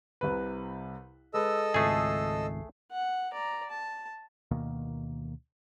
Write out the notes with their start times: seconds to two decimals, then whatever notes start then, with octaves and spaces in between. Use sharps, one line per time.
0.21 C2 C3 B4
1.34 G#3 A4 B4 D#5 E6
1.74 G#1 C#2 A3 G#4 C7
2.91 F#5
3.33 D5 A#5
3.70 A5
4.51 D2 B2 D#3 A#3